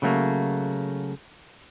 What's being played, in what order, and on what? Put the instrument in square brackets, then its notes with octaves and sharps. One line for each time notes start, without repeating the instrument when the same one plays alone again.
[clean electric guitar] C#3 F#3 A3 A#3